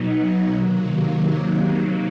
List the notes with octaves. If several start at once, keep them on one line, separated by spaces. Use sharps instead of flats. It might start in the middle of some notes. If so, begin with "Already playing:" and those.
Already playing: B2 F#3 B3 D#4
C3 D#3 F#3 A#3